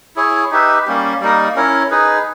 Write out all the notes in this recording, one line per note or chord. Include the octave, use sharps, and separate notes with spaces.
E4 G#4 C#5
D#4 G4 B4 E5
G3 A#3 C#4 G4
G3 A#3 D#4 A#4
C#4 E4 A#4 C#5
D#4 G#4 B4